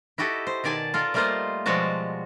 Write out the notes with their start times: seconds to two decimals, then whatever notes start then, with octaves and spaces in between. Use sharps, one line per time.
0.18 E4 F#4 G4 A4 D#5
0.47 C5
0.64 B2 D#3 D5 G#5 A5
0.94 F4 A4 A#4
1.14 G3 A3 A#3 F4 C5 D#5
1.66 B2 F3 G3 G#3 F#4 A5